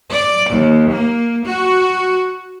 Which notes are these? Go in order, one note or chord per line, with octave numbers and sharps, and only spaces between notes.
D5
D#2
A#3
F#4